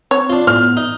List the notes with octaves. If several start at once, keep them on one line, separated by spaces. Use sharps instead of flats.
C4 C#5
D4 F4
A2 B3 F6
D#4